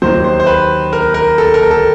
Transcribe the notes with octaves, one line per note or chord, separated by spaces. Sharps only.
D#2 D#3 F#3 C5
C5
C5
B4
A#4
A#4
A4
A#4
A4